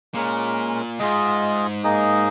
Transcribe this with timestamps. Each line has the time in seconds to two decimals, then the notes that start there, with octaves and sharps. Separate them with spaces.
0.14 A#2 G#3 C#4 A#4
0.99 G#2 F4 G#4 D#5
1.84 A#3 D#4 G#4 D#5